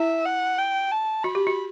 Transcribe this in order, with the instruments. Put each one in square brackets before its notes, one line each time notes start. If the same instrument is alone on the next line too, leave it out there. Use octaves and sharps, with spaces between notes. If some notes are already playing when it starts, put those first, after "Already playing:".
Already playing: [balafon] E4 [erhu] E5
[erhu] F#5
G5
A5
[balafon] F#4 [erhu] B5
[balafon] G4
F#4